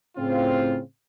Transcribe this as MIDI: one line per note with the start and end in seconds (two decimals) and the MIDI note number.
0.18 0.80 45
0.18 0.80 49
0.18 0.80 60
0.18 0.80 65